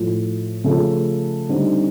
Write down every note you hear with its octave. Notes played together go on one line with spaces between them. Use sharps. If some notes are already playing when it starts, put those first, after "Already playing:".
Already playing: A2 F3 A3
C#3 F3 A3 C#4
D3 G3 C4 D#4